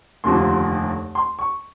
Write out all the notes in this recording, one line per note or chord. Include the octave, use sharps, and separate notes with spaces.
F1 D#2 D3 F3 A#3 C6
C6
C#6